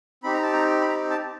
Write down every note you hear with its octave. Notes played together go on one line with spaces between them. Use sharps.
C4 D#4 G4 B5
A#5
A5
A#5
B5
A#5
A5